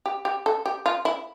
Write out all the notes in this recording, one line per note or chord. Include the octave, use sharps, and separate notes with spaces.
G4
G4
A4
G4
F4
E4